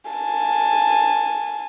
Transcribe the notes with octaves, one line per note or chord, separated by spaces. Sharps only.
G#5 A5